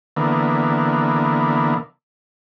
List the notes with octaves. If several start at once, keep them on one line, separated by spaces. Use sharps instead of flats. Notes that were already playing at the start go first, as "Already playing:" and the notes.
D3 E3 A#3 B3